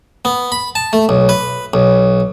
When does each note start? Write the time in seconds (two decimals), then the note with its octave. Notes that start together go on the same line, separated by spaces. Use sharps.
0.25 B3
0.52 B5
0.75 A5
0.93 A3
1.09 B1
1.29 B4
1.74 B1